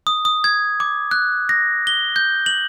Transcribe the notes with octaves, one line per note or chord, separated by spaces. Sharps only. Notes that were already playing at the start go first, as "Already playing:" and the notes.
D#6
D#6
G#6
D6
F#6
A#6
G7
G6
F#7